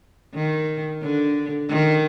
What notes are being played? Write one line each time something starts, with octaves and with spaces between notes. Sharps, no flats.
D#3
D3
D#3